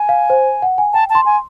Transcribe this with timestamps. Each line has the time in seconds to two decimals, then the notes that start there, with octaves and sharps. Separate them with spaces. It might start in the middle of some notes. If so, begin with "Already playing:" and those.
Already playing: G#5
0.09 F5
0.30 C5
0.62 F#5
0.78 G#5
0.93 G5 A5
1.10 A5
1.15 C6
1.26 G#5